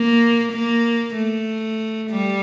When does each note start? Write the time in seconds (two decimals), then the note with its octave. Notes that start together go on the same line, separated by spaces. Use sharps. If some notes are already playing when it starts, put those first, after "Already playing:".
Already playing: A#3
0.52 A#3
1.16 A3
2.11 G3